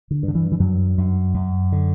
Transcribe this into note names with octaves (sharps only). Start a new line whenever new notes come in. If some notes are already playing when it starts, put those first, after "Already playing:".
D3
G2
D3
E3
E3
F#2 F#3
F#2
F#2
D3